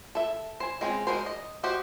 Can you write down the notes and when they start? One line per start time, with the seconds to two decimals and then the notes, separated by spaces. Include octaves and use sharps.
0.15 A4 E5
0.60 C5 G#5
0.81 G#3 C4 C#4
1.07 G#3 D4 F#4 A#4 C5
1.26 D#5
1.63 F#4 G4 C5 D#5